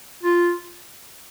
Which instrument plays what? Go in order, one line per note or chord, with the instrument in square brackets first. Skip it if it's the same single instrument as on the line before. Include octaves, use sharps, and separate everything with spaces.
[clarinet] F4